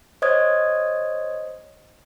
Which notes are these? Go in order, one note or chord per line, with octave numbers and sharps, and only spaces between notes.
C5 C#5 D#5 D#6 G#6